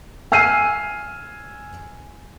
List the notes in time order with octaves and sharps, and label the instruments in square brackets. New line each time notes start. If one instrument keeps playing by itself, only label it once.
[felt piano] G#5 E6 F6 C7 D#7